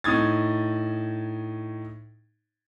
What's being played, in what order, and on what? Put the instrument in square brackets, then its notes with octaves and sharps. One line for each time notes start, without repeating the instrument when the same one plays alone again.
[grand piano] A2 D#4 D#6 G#6 A6